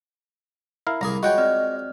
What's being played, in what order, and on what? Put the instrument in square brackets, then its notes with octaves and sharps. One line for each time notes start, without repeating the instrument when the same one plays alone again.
[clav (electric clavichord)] E4 A#4 F5
[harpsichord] C2 A#3 G#4 [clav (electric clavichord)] A#5 [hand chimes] B5
[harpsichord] G#3 F4 C#5 [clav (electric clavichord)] F#4 F#5 G5 [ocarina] D#5
[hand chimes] C4 D5 F6